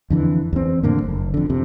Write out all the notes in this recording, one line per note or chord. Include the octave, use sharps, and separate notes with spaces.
F2 D3 E3
E2 C4
F2 A2 D3 A#3
F#1
F2 D3
F2 C3